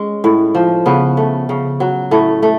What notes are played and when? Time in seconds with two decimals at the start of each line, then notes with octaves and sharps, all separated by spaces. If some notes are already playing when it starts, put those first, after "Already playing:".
Already playing: G#3 C#4
0.24 A2
0.55 F3
0.86 C#3 B3
1.17 A3
1.49 C#3
1.80 F#3
2.11 A2 A3
2.42 A3